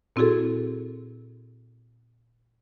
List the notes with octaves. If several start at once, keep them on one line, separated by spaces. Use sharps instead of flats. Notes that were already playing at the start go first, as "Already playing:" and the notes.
A#2 C4 E4 F#4 G#4 A4